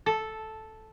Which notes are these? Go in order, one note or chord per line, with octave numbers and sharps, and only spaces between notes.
A4